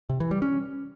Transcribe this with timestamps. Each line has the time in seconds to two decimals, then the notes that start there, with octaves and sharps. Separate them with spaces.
0.10 C3
0.20 E3
0.31 G3
0.42 C#4